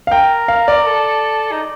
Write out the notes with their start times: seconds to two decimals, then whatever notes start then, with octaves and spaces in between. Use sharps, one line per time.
0.07 F5
0.11 A#4 G5
0.48 F5
0.68 D5
0.87 A4
1.52 D#4